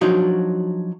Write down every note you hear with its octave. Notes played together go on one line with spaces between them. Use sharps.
F3 F#3 D4 D#4 F#4